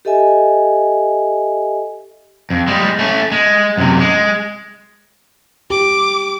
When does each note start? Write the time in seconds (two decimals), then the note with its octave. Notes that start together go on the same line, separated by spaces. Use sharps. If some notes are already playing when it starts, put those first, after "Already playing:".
0.05 G4 A4 D#5 E5 G#5
2.50 F2
2.68 G3 G#3
2.99 A3 C#4
3.32 G#3
3.78 F#2 C3
3.99 G#3
5.70 G4 D6